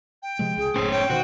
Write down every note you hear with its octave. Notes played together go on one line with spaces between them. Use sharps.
G5
C3 F3 G#3
C#2 G#4
F#1 A2 C#4 C5
C#5 G5
B2 D#3 F#4 C5